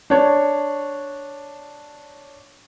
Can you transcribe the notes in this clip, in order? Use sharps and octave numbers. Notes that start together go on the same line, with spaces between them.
D4 C#5